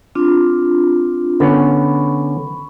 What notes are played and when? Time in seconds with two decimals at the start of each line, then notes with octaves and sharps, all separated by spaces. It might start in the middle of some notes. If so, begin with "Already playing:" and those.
0.15 C4 D4 F4
1.40 D3 B3 C#4 B5 C#6